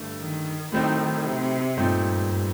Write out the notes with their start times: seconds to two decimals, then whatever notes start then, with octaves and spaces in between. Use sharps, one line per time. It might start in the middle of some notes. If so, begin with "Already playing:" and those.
Already playing: G2 D3 A3
0.19 D#3
0.72 A2 D#3 F#3 A3 C4 D#4
1.25 C3
1.77 G2 A#2 A3 C4 D#4